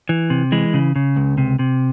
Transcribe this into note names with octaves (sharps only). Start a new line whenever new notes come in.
E3
C3
E3 G#3
C#3
C#3
C#2
C3
C3